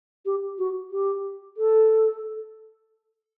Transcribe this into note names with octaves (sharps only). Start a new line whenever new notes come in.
G4
F#4
G4
A4